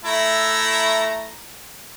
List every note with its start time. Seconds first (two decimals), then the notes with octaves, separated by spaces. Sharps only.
0.05 A3 E4 A#5